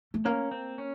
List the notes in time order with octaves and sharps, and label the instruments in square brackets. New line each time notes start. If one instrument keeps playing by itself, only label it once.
[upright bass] A3
[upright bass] A#3 [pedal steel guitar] C#4
[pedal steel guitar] C4
C#4